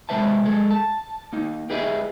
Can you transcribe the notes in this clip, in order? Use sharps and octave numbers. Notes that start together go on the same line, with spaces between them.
C3 G#3 B4 C5 E5 A5
G#3 G#4 A4
A5
A#3 D#4
G4 G#4 B4 D#5 E5